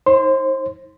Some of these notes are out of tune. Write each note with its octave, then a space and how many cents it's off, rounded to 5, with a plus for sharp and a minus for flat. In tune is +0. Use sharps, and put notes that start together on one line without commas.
D#4 +40 C5 +35 C6 -25